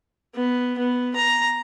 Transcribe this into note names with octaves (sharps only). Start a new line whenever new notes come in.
B3
B3
A#5